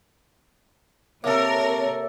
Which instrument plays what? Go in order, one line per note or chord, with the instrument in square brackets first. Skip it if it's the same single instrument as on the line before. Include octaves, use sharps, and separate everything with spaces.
[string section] C3 A#4 [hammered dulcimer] A#3 A4 [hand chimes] G4 E5 [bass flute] C#5